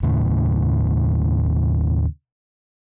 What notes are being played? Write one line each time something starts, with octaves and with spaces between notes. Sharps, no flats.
D#2 A2 C#3